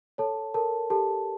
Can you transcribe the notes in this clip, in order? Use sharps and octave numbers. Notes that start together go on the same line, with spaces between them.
A4 C#5 A5
A4 A#4 A5
G4 A4 A5